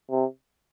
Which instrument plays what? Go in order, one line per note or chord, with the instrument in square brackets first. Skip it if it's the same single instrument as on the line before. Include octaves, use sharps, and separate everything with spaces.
[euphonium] C3